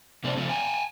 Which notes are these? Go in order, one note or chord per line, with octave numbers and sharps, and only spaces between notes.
C3 A3 C4 D4
C#3 F3 A3
G5 G#5 A#5